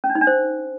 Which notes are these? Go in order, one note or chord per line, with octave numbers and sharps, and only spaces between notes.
C#4
D4
D#4
D4
C5